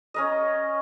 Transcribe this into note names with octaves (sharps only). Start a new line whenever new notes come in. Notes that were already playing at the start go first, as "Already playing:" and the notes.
C#4 A#4 D#5